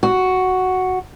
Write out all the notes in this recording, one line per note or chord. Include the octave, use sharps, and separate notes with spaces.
F#4